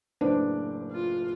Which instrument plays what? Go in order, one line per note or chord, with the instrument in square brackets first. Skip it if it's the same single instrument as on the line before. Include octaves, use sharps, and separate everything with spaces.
[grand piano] F#1 A2 D6 [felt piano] D4 B4 C5
[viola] F4